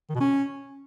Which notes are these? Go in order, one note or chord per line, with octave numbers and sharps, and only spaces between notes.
D#3
B2
C#4